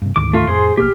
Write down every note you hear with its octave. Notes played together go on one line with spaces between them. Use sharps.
G2 C3
D2 G#2 D#3 D6
A3 F4
F2 A2 G#4 C5 C6
A#1 B2 A#3 G4 F6